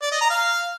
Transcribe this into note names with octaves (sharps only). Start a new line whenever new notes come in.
D5
D#5
A#5
F5